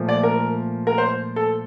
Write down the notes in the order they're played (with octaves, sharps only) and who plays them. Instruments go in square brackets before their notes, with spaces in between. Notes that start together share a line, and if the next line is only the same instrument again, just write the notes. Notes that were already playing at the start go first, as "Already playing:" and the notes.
Already playing: [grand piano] A#2 F3 A3
D5
A#4
A#4
C5
A4